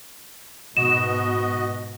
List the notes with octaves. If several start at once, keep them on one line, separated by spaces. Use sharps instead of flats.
G#2 B2 B3 F#4 D#5 E7